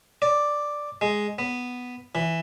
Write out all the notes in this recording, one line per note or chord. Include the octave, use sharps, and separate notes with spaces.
D5
G#3
B3
E3